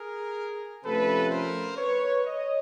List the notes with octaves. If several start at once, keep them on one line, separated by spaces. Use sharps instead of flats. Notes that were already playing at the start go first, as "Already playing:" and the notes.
Already playing: G#4 A#4
C3 F3 A3 C#4 A4 B4
A#4 C5
B4 C#5
C#5 D#5